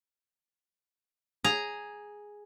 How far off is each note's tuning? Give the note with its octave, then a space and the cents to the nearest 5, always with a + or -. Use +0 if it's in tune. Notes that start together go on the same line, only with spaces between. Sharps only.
G#4 +0 A#5 +0